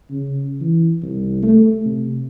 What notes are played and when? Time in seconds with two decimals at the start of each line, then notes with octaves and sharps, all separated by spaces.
0.11 C#3
0.61 E3
1.02 C2
1.43 A3
1.85 C3